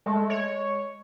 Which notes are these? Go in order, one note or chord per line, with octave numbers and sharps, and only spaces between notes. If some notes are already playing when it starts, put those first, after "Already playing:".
G#3 A3
C#5